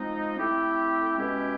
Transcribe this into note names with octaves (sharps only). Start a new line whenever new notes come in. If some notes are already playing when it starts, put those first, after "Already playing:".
Already playing: F3 G#3 C4 D#4
A3 C4 E4 G4
B2 G#3 C#4 E4 G4